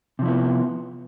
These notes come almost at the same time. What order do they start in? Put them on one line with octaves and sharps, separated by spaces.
C3 F3 E4 B3